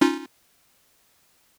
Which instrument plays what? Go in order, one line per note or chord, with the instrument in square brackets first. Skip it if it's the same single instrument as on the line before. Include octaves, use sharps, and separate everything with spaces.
[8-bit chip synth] C#4 D#4 F4